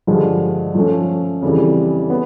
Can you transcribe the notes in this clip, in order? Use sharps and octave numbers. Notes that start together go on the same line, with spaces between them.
G2 D3 F3 G#3
F3 A3 C#4
F2 C#3 E3 G3
B3